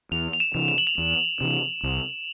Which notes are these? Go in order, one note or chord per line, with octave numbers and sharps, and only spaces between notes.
E2 F7
F7
E7
C3 E3
F7
F#7
F7
E2
C3 E3
C2